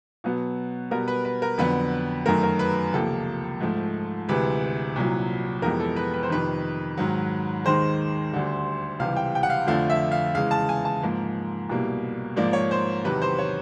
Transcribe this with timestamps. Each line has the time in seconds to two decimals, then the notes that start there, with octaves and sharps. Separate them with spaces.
0.24 B2 F#3 B3
0.91 B2 G3 B3 A#4
1.08 B4
1.25 B4
1.42 A#4
1.58 F2 D3 F#3 B3 B4
2.25 F#2 D#3 F#3 A3 A#4
2.43 A#4
2.59 B4
2.93 C#2 C3 F3 A#3 A4
3.60 G#2 F3 A3
4.28 D2 C3 E3 G#3 B4
4.96 C2 A#2 F#3
5.62 F2 C3 E3 G#3 B3 A#4
5.80 A4
5.96 B4
6.14 B4
6.23 C5
6.30 F2 C3 D#3 B4
6.98 G#2 D#3 F#3
7.65 D#2 D#3 G#3 C5
8.32 D2 D3 G3
8.99 C#2 C3 E3 G3 F5
9.17 G5
9.35 G5
9.43 F#5
9.50 F5
9.67 F2 D3 F3 A3 F5
9.90 E5
10.12 F5
10.34 E2 C#3 E3 G#3 F5
10.51 A5
10.69 G#5
10.85 A5
11.02 G#2 F3 A#3
11.69 C2 B2 G3 A#3
12.36 G#2 F3 A#3 D5
12.53 C#5
12.71 C5
13.04 E2 C3 D#3 F#3 B4
13.22 C5
13.38 C#5